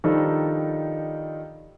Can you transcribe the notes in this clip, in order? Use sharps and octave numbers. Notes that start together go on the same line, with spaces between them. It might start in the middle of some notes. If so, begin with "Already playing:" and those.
D#3 F3 G3 D4 D#4 A4